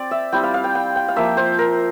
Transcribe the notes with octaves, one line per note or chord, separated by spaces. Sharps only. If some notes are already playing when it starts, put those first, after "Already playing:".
Already playing: C4 D5
E5
G3 C4 E4 G5
F5
F5
G5
G5
G5
F5
F3 A#3 F4 E5
C5
A#4